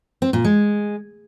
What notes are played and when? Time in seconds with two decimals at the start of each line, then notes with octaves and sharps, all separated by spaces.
0.22 C4
0.33 A#2
0.45 G#3